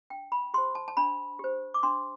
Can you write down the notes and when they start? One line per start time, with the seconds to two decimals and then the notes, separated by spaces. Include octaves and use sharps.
0.10 D4 G5
0.32 B5
0.54 G4 C5 C6
0.75 A5
0.88 A5
0.97 D4 B5
1.39 G4 C5
1.74 D6
1.83 D4 C6